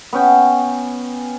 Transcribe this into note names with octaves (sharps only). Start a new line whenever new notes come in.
B3 C#4 G5